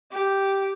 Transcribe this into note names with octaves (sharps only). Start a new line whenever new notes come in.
G4